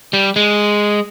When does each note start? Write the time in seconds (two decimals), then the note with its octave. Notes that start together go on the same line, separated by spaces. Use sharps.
0.13 G3
0.36 G#3